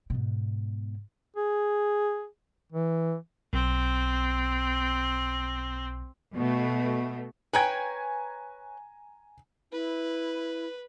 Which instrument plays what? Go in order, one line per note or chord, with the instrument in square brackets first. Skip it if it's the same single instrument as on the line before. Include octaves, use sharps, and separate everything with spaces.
[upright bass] G#2 B2
[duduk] G#4
E3
[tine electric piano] B1 [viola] C4
[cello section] B2 A3
[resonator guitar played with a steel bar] B4 C#5 G5 [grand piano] G#5 A#5 G#6
[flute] E4 [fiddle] B4